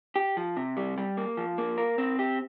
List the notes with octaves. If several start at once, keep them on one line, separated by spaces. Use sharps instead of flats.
G4
F3
C3
G3
G3
A#3
F3
A#3
A#4
C4
G4